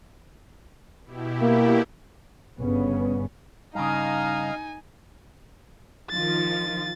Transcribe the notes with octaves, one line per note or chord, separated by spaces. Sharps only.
B2 E4 G4
A#3
G1 G2 C#3 B3 C#4
G2 C#3 D#4 D#5 F5 G#5 A#5
D#3 F3 F4 A6